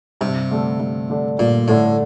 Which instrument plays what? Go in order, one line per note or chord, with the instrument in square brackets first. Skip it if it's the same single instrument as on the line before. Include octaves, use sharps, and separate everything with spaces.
[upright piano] G2 [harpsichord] C3
[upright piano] D3 A3 D4 A4
G2
D3 A3 D4 A4
[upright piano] G2 [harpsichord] A#2
[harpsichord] A2 [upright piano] D3 A3 D4 A4